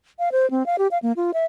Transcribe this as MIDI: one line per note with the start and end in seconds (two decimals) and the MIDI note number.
0.19 0.29 77
0.32 0.49 72
0.51 0.66 60
0.66 0.76 77
0.78 0.87 67
0.91 0.98 77
1.02 1.12 58
1.16 1.31 65
1.34 1.45 76